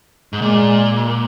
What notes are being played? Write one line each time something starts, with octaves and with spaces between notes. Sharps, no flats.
G#2
A#2 G#3